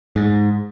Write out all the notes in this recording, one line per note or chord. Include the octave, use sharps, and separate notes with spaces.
G#2